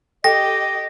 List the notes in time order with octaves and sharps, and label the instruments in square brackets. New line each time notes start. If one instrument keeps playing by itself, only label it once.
[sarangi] G4 [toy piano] A4 G5 [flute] D#5 [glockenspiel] A#6